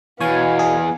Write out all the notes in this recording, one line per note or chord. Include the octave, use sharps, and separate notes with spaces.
E2 B2 B3 C#5 F5 G#5
G#4